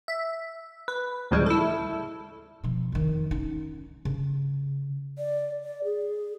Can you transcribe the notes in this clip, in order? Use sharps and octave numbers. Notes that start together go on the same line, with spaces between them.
E5
B4
D2 A2 C#3 F3 G3 G#3
E4 A4
B2 F3
F2 D#3
C#4 D#4
C#3
D5
D5
G#4